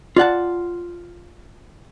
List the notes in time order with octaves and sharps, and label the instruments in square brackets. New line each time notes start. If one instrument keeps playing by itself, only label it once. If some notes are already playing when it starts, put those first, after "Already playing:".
[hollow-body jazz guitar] F4 D5 F#5 A5